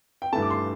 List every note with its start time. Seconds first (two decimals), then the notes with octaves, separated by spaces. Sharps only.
0.22 G5
0.33 G2 E3 A3 A5
0.42 D6
0.50 C6